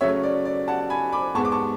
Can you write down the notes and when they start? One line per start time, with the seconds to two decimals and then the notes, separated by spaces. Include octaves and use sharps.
0.01 C#3 F#3 A3 C#5 E5
0.23 D5
0.45 D5
0.68 F#5 A5
0.90 G#5 B5
1.12 B5 D6
1.35 G#2 G#3 B3 A5 C#6
1.45 D6
1.52 A5 C#6